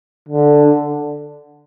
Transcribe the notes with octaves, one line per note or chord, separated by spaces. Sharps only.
D3